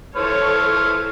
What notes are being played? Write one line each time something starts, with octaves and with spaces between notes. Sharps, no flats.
E3 A4 C5 C#5 F6